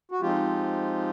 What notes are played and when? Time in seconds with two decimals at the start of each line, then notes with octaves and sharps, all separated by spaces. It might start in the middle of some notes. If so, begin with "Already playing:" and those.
0.12 F#4
0.21 F3 G#3 C4 D#4 F4 G4